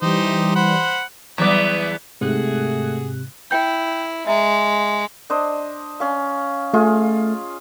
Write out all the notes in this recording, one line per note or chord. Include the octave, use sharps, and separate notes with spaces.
E3 G3 D#4 G4 C5
C5 F#5 B5
E2 F#3 G3 B3 D5 E5
G#2 C3 A3 F#4 G#4 F#6
E4 G5 G6
G#3 E5 A#5
D4 C5 D#5
C#4 F5
A3 F4 G#4